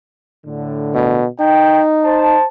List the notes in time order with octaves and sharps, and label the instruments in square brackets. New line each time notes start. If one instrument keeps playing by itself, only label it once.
[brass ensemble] A2 D3
[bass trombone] B2
[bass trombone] D#4 [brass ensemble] G5
[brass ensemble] C5 A5